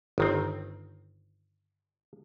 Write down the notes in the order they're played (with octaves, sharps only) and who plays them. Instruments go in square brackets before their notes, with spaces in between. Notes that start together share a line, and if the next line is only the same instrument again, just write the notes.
[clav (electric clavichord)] G1 D#3 C4